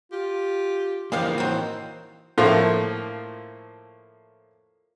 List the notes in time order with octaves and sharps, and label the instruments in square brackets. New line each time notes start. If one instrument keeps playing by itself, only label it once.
[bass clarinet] F4 [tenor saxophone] G4
[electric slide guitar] E3 A#3 [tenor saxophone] F3 [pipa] G#3 G4 F5
[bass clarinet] A2 [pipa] D#3 C4 [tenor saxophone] F#4
[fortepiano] A2 F3 A3 A#3 F4